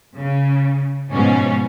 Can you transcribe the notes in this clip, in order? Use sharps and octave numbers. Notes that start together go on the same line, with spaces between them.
C#3
G#2 B2 F3 C#4